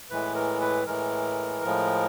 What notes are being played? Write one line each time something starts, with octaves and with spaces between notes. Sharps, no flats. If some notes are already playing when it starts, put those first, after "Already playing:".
A2 E3 G#3 B4
A#4
B4
A2 E3 G#3 A#4
A2 F3 G#3